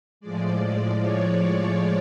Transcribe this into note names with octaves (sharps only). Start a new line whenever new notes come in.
A2 F3 G#3 D5
D5
C#5
D5